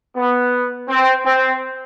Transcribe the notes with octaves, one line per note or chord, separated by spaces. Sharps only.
B3
C4
C4